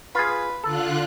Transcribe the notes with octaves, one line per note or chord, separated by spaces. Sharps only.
F4 G#4 B4
D3 F4 A4 F#6